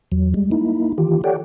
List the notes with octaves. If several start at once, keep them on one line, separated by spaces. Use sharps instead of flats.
E2 F#3
G3 G#3
A#3 D#4 E4
D#3 E3 F4 G4
G4 A4 C#5 D5 F#5 G5